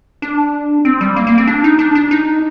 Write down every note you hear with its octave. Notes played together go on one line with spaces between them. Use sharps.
D4
C4
G3
A#3
A#3
C4
D4
D#4
D4
D4
D#4